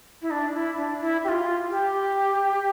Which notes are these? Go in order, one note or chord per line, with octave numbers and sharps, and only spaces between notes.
E4
D4
E4
D4
E4
G4
F4
G4